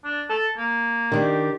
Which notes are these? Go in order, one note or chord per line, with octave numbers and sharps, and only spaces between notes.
D4
A4
A#3
D#3 D4 G4